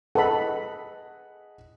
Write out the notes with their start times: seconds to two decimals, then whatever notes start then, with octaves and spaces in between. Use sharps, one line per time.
0.15 G#4 A4 B4 D#5 F#5 B5